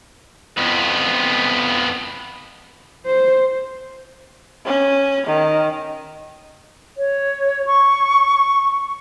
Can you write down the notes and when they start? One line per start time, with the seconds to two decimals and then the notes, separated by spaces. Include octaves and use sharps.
0.58 F2 B3
3.06 C5
4.65 C#4
5.27 D#3
6.98 C#5
7.67 C#6